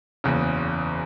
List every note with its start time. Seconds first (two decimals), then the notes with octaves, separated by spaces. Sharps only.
0.24 F#1 E2 C#3